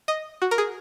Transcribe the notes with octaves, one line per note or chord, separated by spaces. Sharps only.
D#5
F#4
A#4
G#4